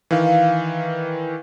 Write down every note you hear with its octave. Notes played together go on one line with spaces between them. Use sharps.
D#3 E3 F5